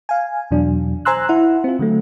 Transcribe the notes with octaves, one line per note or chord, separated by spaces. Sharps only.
F5 G#5
E2 B2 F#3 D4
C5 G#5 A#5 C6 E6 F#6
E4 F#5
C4 F4
D3 F#3 A3